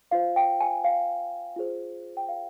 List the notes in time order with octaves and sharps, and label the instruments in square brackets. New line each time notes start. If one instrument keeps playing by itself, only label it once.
[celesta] F4 C5 F5
G5
G#5
F5
F4 G#4 C5
G5
F5